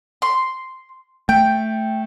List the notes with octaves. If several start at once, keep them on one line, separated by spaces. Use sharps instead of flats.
C6
A3 G5